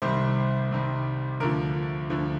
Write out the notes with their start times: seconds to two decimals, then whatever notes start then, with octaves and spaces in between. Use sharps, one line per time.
0.02 C2 C3 D#3 G3 C5
0.71 C2 C3 D#3 G3
1.40 D2 D3 F3 A#4
2.10 D2 D3 F3